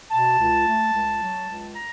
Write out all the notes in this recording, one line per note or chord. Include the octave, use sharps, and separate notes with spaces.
B2 A5
C#2
A3
C#2
F#3
C#2
A#5